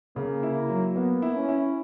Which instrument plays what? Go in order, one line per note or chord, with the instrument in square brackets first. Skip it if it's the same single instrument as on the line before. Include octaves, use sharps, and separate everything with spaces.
[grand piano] C#3 [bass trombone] A#3
[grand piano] E4
F#3
[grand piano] A#3 [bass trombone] B3
[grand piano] E4
[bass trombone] C#4
[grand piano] E4